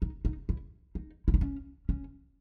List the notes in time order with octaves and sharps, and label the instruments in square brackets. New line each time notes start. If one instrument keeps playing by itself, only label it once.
[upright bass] D#4
D#4
E4
D#4
E4
D#4
C#4
C#4